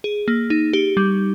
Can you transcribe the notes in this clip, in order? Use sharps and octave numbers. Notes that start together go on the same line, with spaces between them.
G#4
A#3
D#4
G4
G3